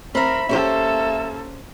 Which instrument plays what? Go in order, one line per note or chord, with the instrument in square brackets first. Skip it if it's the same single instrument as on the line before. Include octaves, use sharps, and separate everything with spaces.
[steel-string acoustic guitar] C4 E5 [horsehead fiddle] A#4 B5
[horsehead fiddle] A#3 A4 [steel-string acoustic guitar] C#4 G4 C5 [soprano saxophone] E5